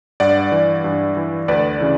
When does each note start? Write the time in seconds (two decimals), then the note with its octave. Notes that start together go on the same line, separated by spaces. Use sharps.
0.20 G2 D5 F#5
0.52 E3
0.84 G2
1.17 E3
1.48 D2 B4 D5
1.80 C#3 E3